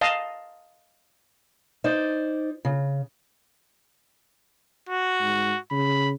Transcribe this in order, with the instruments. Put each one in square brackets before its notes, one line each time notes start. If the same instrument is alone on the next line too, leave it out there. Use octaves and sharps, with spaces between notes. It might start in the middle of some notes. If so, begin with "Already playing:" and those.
[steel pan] D#5 F5 A5
[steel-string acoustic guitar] D#4 C5 D5
C#3
[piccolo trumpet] F#4
[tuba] G#2
[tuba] C#3 [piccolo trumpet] B5